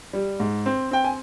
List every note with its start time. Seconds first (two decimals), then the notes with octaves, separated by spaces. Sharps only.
0.13 G3
0.40 G#2
0.66 C4
0.91 C4 G5
1.04 G#5